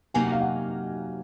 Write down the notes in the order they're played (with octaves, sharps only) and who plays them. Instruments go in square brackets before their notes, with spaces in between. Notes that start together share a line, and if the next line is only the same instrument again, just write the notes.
[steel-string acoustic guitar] C3 F#3 A#3 D#4 [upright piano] G#5
[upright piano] F#5
F5
F#5